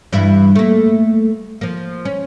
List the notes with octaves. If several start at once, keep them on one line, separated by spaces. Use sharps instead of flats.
G2 E3 E4
A3 A#3
F3 A#3
C#4